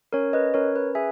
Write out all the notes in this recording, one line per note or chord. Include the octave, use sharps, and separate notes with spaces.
C#4 A#4 C#5
B4 D#5
C#4 A#4 C#5
B4
G#4 E5 G#5